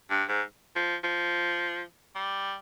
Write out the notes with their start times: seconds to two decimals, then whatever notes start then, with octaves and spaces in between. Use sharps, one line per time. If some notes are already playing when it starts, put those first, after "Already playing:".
0.10 G2
0.28 G#2
0.76 F3
1.03 F3
2.15 G3